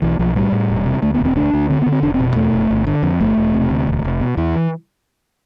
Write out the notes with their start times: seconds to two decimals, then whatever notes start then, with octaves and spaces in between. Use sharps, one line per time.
0.02 B1 E3
0.19 B1 F3
0.35 A2 G3
0.52 A2
0.70 E1
0.86 C3
1.02 D2 A3
1.14 E1 B3
1.25 C4
1.36 D2 D4
1.54 D2
1.70 D3 C4
1.82 D3 B3
1.92 C4
2.03 F1 D4
2.14 C4
2.20 B2
2.36 E2 A3
2.53 F1
2.71 G1
2.87 D3
3.03 F2
3.21 G1 A3
3.37 E1
3.54 C3
3.70 D2
3.87 E1
4.04 F1
4.21 B2
4.37 E2 E3